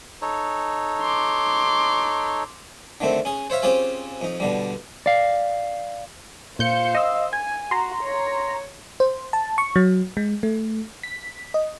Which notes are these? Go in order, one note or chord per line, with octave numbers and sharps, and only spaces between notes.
D#4 A4 C#5
C6 D6
D3 D#3 A3 C4
C#4 G#4
C5 C#5 E5 F5
C4 C#4 F4 G4 G#4 C5
F2 D#4
B2 D3 G3
D5 F5
A#2 C5 F5 G6 C#7
D#5 E6
G#5 G#6
F#4 A#5 C6
C#5
C5
A5
C#6
F#3
G#3
A3
B6
D#5